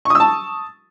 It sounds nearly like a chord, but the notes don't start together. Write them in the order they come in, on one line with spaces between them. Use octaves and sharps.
C#6 D#6 E6 A5